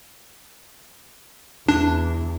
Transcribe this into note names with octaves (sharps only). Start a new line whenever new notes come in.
E2 D4